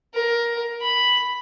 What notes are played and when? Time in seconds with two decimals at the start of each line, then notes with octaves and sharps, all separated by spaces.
0.14 A#4
0.82 B5